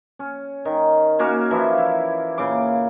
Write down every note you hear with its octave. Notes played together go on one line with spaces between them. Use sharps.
C#4
D#3
A#3 C#4 F#4 C#5
E3 F3 E4
E4
A#2 C#3 E4 D6